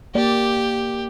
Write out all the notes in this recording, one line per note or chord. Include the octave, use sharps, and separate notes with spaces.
A#3 G4 D5